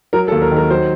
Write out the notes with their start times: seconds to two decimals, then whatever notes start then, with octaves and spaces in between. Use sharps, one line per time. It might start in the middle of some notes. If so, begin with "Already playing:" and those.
0.13 F#3 A#4
0.28 A4
0.32 D#2
0.42 A#4
0.51 D#3
0.56 A#4
0.70 F#3 C5